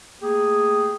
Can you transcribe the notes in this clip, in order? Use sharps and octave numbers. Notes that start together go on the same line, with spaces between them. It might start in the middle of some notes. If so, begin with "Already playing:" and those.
A3 A#3 G4 G#4